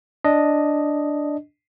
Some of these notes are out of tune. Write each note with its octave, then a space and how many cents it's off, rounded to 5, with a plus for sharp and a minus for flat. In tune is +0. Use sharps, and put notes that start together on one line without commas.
D4 +0 D#5 +0